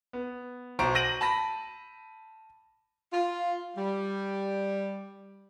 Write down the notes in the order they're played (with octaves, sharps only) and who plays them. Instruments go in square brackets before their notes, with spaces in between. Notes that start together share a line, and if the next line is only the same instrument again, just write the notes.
[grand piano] B3
B1 C5 A#5 C#6 D7
G6 A#6 D7 D#7 F#7
A5 B5 A#6
[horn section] F4
G3